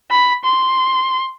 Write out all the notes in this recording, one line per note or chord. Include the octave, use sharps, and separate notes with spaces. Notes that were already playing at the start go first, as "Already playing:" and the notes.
B5
C6